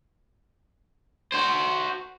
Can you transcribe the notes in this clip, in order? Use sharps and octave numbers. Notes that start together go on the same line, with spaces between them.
F#4 C5